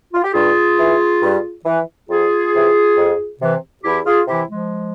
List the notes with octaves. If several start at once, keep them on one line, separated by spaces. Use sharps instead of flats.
F4
G4
G2 F4 G#4
E3
G2
E3
F2 F4 G#4
C3 E3
F2
C3 E3
E2 E4 G4
F4 G#4
C3 E3 E4 G4
F3 G#3